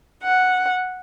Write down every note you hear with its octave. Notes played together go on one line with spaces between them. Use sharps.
F#5